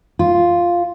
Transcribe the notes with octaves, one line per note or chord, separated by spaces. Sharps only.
F4